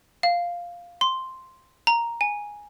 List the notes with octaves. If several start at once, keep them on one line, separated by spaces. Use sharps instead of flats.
F5
C6
A#5
G#5